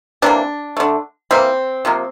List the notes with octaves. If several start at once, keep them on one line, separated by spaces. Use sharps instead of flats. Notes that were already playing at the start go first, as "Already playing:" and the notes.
C3 E3 A#3 D4
D3 A3
E3 G3 A#3 C4
C3 F3 A#3